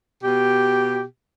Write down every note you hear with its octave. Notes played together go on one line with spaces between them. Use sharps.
B2 G4